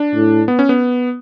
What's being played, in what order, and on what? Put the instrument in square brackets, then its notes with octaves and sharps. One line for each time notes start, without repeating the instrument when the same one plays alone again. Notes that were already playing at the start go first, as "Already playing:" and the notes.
Already playing: [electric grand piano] D4
[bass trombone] A2
[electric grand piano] B3
C#4
B3